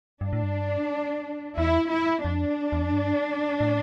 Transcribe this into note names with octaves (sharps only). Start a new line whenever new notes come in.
G2 D4
A2
G2
E2 E4
E4
F2 D4
E2
F2
G2
A2